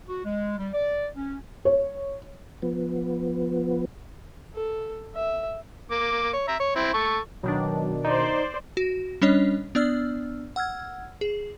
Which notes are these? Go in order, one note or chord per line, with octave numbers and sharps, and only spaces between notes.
F#4
G#3
G3
D5
C#4
C#5
F3 B3
A4
E5
A#3 D6
C#5
E5 A#5
C#5
C4 E4
A4 C#6
B2 D#3 F#3 D4
D#4 C5 D5
F#4
G3 C#4 D4 C#5 D#5
B3 D4 D5 E6 F6
F#5 E6 F6 G#6
G#4